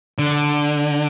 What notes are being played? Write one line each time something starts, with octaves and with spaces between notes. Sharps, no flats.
D3